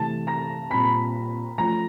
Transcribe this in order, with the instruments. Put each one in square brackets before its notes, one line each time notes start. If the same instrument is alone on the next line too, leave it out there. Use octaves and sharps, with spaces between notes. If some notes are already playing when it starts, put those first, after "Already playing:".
Already playing: [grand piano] C3 E3 A3 C4 [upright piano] A5 A6
[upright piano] A#5 A#6
[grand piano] A#2 G3 C4 [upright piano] B5 B6
[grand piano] F3 A3 C#4 F4 [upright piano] A#5 A#6